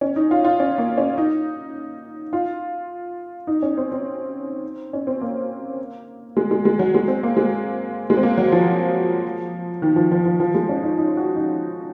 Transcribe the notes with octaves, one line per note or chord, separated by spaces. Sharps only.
C#4
D#4
F4
F4
C#4
A#3
C#4
D#4
F4
D#4
C#4
C4
C4
C#4
C4
A#3
G#3
G#3
G#3
F#3
G#3
C4
A#3
G#3
G#3
C4
A#3
F#3
F3
D#3
F3
F3
F3
F3
G#3
C#4
D#4
D#4
F#4
D#4